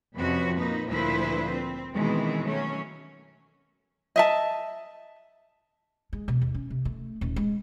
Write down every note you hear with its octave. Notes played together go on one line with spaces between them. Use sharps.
F2 C3 F3 C#4 F#4 B4
A#2 A#3 D#4 B4
D2 A#2 F3 E4 B4 C5
C4
B2 D#3 E3 G#3 C4
F#3 A3 C#4
D#5 E5 A5
G#3
B2
D#2
C#4
C3
A3
D#1
G#3